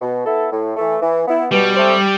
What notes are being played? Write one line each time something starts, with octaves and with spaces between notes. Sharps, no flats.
B2
B3 E4 A4
A2
E3 A3
E3
B3 E4
B2 G3
A3 C4